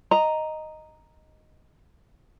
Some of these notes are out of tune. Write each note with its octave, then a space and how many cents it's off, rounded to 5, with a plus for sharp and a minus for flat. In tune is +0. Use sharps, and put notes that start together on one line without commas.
D#5 +0 A#5 +0